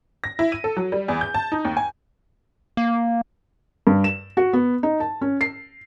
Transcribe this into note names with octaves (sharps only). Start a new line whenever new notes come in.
A#6
E4
D#7
A4
F#3
G3
E2
G6
A5
D#4
D#2
G#5
A#3
G2
E7
F#4
B3
D#4
A5
C#4
C7